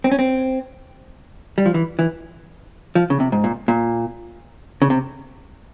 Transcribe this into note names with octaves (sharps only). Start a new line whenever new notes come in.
C4
C#4
C4
G3
F3
E3
E3
F3
C#3
C3
G#2
A#2
A#2
C#3
C3